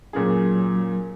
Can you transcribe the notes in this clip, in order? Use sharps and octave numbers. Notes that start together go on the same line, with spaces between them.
A#2 F#3 C#4 G#4